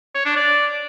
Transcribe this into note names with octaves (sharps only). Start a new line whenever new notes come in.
C#5
D4
D5